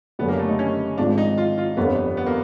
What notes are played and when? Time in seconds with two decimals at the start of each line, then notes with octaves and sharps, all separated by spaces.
0.19 F#1 F#2 D3 G3 B3
0.28 A#3
0.39 A3
0.48 D#4
0.59 C#4
0.97 G#1 G#2 F3 D4
1.18 D#4
1.38 F4
1.58 F4
1.77 G1 F2 D3 G3 A#3 B3
2.17 B3
2.26 A#3